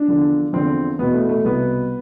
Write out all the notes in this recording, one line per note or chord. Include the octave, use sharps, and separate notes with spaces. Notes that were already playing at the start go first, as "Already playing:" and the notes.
Already playing: D4
E2 D3 F3
E2 D3 F3 C4
E2 B2 B3
A3
A3
C2 B2 B3